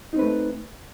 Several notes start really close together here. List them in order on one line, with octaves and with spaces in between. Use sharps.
D#4 C4 B4 A3